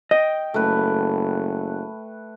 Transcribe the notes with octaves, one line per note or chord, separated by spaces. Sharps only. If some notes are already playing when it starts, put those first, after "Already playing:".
D#5 G5
F#1 A3 B4